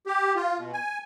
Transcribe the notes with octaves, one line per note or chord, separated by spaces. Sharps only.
G4
F4
B2
G#5